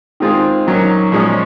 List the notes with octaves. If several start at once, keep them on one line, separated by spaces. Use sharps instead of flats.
D#3 G#3 C4 F4 G#4
D#3 F#3 A#3 C#4
A#2 F3 G#3 C#4 G#4